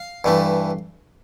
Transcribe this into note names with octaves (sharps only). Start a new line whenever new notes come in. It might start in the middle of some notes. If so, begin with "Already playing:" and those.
Already playing: F5
G2 E3 A3